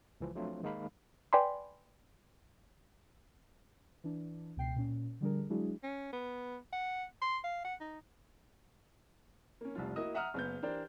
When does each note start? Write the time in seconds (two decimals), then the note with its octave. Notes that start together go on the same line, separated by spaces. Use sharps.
0.21 C#2 E3 F3
0.35 F3 F#3 A3 C4 D4 F4
0.63 D#3 G#3 A#3 D#4 F5 B5
1.33 B4 D5 G5 G#5 B5 C6
4.04 E3 D4
4.57 C#2 B2 G5 C7
4.76 A#2 C#4
5.21 D3 F3 G3 D4 G#4 A#4
5.50 F#3 G#3 D4 E4 F#4 G#4
5.83 C#4
6.13 B3
6.73 F#5
7.22 C6
7.44 F5
7.65 F#5
7.80 D#4
9.61 A#3 C#4
9.75 F1 C2 F3 F4
9.96 A#3 E4 F#4 D#5 D#6
10.15 E5 F#5 A#5 D#6 F6
10.34 F#1 B3 G6
10.62 E3 D4 G4 A#4 C5 D5